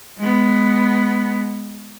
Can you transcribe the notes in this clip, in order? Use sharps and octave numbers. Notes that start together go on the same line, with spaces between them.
G#3 B3